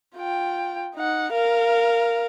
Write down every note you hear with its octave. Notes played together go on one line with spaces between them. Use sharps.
F4 G5
D#4 F#5
A#4 F5